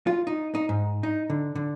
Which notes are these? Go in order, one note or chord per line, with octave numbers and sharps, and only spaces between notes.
F4
D#4
D#4
G#2
D#4
D3
D3